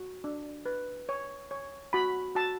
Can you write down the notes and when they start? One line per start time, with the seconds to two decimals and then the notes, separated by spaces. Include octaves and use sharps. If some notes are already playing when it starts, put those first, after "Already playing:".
Already playing: F#4
0.24 D4
0.66 B4
1.09 C#5
1.51 C#5
1.93 F#4 B5
2.35 F#4 A5